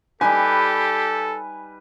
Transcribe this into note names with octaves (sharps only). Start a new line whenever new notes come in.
G3 D#4 G4 A4 B4 G#5